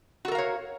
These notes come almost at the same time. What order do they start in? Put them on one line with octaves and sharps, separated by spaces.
F#4 A4 A#4 F5 C#5